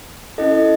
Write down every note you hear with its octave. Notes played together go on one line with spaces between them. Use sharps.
C#4 E4 A4 D#5